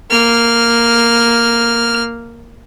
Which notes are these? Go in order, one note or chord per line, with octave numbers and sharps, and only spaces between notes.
A#3 F6